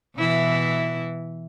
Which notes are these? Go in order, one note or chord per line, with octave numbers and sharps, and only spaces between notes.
B2 E3 E4